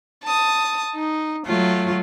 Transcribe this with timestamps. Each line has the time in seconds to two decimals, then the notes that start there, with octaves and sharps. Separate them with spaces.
0.24 A5 D#6
0.95 D#4
1.46 F#3 A3 F4